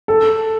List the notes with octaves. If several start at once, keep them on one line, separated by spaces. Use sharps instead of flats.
A4